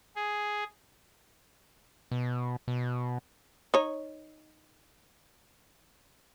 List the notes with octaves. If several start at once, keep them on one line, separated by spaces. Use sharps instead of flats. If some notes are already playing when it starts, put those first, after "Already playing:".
G#4
B2
B2
D#4 C#5